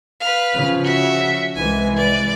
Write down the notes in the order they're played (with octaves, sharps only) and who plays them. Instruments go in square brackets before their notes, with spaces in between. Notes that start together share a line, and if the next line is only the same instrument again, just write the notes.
[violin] B4 F5
[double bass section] C#3 F3
[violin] F#4 E5
[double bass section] C2 E3 G#3 [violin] G#5
[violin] D5